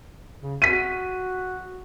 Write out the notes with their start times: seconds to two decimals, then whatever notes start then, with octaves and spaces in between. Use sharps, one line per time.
0.42 C#3
0.62 F#4 B6 D#7